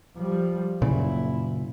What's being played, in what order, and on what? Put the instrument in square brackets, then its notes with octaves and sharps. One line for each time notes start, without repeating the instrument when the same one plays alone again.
[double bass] F3 G3
[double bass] F#1 E4 [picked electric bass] A#2 C#3